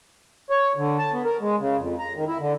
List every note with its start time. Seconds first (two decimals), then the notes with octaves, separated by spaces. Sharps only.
0.50 C#5
0.77 D3
0.99 A5
1.13 B3
1.25 A#4
1.41 G#3
1.60 C#3
1.78 F2
1.99 A#5
2.16 D#3
2.27 E4
2.39 D3